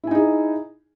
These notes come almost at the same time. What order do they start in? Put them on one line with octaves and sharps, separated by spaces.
E4 G#5 D#4 G#4